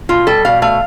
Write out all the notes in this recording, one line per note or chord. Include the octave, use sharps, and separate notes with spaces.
B2 F4
G3 A4
B2 F5
A3 F5